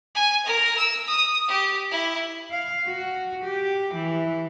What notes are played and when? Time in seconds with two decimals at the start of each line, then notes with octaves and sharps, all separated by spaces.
0.15 G#5
0.46 A#4
0.77 E6
1.08 D#6
1.48 G4
1.91 E4
2.51 F5
2.86 F#4
3.44 G4
3.95 E3